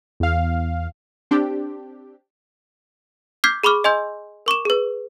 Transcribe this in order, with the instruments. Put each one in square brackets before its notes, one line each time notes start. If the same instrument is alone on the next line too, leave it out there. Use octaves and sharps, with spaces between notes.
[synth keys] E2 F5
[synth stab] C4 D4 G4
[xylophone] D6 F6 G6 G#6 B6 C7
G#4 B5 C#6 D6 F6
D#5 G#5 C6 E6 G6
A#4 C#6 D6 E7
G#4 B4